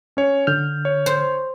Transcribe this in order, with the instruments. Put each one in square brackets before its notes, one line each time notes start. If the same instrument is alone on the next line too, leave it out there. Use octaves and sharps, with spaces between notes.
[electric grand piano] C#4 C#5
[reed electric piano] D3 F6 [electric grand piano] G6
[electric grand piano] C#5
[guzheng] C5